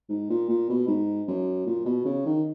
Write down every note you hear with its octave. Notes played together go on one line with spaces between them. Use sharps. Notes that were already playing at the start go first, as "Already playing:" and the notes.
G#2
A#2
A#2
B2
G#2
F#2
A#2
B2
C#3
D#3